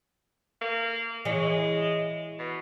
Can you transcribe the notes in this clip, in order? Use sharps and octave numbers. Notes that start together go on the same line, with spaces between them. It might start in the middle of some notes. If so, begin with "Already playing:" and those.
A#3
E3 G#3 C#5
B2